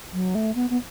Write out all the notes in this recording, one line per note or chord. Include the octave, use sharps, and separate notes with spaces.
F#3
A3
B3
B3